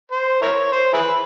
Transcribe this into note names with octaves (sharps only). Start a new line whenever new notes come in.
C5
E4 A#4 C#5
C5
E4 G#4 B4